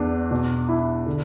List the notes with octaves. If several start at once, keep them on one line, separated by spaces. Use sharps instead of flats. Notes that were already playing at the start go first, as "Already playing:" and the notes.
Already playing: E2 D4
B2
E4
D3